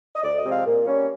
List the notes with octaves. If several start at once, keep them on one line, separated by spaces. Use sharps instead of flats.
D#5
D2 D5
D#5
C3 F3 G#3 C4
F5
A#2
G3 A#3 C#4